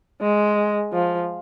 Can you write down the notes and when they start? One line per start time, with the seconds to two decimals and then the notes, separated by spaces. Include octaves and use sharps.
0.21 G#3
0.93 F3